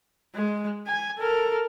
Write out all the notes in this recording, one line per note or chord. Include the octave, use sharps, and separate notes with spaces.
G#3
G#5
A4 A#4